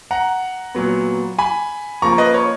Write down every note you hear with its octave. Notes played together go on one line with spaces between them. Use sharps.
F#5 A#5
A#2 F#3 B3
G#5 B5
C#3 F3 A#3 A#5 C#6
B4 D#5
C#5